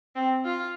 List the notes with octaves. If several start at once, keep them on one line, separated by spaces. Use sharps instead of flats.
C4
F4